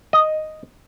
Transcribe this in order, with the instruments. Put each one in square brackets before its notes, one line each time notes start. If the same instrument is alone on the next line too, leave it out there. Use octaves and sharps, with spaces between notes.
[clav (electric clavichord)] D#5